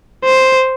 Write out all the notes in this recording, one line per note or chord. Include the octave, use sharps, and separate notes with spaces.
C5